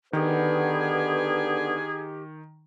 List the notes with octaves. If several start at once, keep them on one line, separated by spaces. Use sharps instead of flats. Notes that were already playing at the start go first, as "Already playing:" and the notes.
D3 D#3 B3 G4 G#4 B4